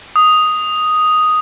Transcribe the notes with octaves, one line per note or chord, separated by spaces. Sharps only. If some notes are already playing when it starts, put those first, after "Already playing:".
D#6